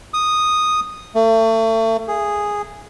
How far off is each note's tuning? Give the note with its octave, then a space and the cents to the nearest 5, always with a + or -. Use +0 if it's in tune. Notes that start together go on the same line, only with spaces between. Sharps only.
D#6 -5
A3 +35
G#4 -5